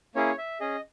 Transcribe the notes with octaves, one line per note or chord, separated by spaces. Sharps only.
A#3 C#4 E4 G#4 C#5
E5
C#4 G#4 D#5